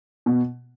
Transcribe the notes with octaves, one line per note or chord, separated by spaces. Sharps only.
B2